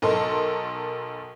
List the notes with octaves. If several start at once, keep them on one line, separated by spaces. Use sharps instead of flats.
B1 A4 A#4 D#5 C6